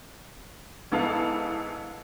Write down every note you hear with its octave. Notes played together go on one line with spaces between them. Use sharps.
G#2 B3 E4 A4 F5